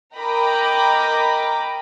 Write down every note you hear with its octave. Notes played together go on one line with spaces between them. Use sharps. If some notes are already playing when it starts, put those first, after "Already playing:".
A#4 D#5 G5 A#5 B5 D6